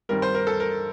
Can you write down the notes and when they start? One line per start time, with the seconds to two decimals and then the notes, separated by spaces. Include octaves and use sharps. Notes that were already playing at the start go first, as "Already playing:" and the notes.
0.09 G2 D#3 G3 C4 A#4
0.22 C5
0.35 A#4
0.47 A4
0.60 A#4